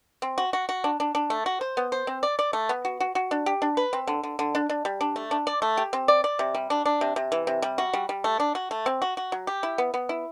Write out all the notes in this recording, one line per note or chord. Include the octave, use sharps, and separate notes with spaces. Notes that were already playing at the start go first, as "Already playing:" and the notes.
C4
F#4
F#4
F#4
D4
D4
D4
A3
F#4
C5
B3
C5
C4
D5
D5
A3
B3
F#4
F#4
F#4
D4
G4
D4
B4
C4
D3
D3
D3
D4
D4
G3
D4
A3
D4
D5
A3
G4
C4
D5
D5
C3
G3
D4
D4
C3
C3
E3
C3
G3
F#4
G3
G3
A3
D4
F#4
A3
C4
F#4
F#4
F#3
G4
E4
B3
B3
E4